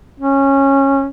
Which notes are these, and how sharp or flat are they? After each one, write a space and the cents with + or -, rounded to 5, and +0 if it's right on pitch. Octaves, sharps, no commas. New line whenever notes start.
C#4 -15